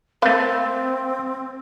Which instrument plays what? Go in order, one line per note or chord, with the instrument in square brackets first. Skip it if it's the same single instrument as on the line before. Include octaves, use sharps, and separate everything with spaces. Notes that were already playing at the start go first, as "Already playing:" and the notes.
[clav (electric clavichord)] A3 B4 [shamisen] A#3 F5 [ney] C4